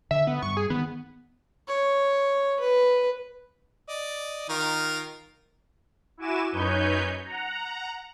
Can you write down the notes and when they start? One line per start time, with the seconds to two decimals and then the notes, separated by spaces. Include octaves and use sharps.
0.11 D3 E5
0.27 B3
0.43 G2 C#6
0.57 G#4
0.70 D#3 B3
1.68 C#5
2.60 B4
3.88 D5 D#5
4.49 D#3 F4 A#4
6.17 E4 F#4 G#5 D6 E7
6.52 F#2 D#4 B4 C#5 G#5 G6
7.26 F#5 A#5